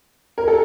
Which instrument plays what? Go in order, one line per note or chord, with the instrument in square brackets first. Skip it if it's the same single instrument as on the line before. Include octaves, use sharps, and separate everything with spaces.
[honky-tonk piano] A#4
A4